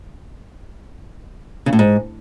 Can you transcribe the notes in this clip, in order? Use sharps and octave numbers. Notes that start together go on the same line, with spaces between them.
C#3
A2
G#2